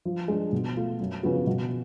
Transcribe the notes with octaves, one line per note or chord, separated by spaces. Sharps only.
F3
G#3 D4
B2
A3 F4
F#2
C#3 F3 B3 F#4
B2